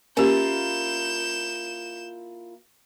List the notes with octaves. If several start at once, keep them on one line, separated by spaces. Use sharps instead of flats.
A#3 C#4 E4 F4 G4 G6 E7